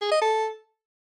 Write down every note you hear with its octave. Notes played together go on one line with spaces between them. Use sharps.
G#4
D#5
A4